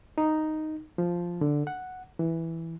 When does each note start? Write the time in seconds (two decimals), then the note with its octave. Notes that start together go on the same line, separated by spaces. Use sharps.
0.18 D#4
0.98 F3
1.41 D3
1.67 F#5
2.19 E3